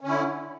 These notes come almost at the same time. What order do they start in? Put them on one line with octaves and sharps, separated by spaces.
C#4 D3 E4